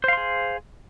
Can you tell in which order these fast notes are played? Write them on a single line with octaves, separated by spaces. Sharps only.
C5 F5 C6 G#4